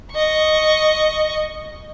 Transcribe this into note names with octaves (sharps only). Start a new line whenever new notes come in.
D#5 C#6